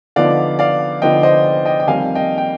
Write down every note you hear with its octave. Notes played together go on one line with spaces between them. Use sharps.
D3 F3 B3 D#4 D5 F5
D5 F5
D3 F3 B3 D#4 D#5 G5
C5 D#5
D#5 G5
G5
F2 D#3 G3 F5 G#5
D#5 G5
G5